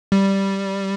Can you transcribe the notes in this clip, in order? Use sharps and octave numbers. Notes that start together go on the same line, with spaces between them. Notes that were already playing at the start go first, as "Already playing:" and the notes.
G3